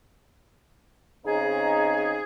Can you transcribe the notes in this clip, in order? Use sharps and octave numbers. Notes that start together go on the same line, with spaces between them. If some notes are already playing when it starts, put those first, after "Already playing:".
C#3 C4 D#4 G#4